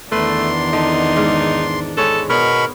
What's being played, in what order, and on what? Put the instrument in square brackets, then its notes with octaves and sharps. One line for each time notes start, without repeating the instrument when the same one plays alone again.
[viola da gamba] E2 D#3 D4 [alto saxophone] A3 [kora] B4 [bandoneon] C6
[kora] D3 [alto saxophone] D#4
[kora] G#2
[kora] G#3 B4 C#5 [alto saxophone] A4
[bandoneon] B2 B5 C#6 [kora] B3 B4 C#5 [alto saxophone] A#4